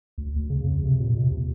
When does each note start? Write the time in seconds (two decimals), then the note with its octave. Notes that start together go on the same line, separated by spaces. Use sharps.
0.18 D2
0.36 D2
0.50 C#3
0.64 F2
0.84 C3
1.00 A#2
1.16 C3
1.31 D#2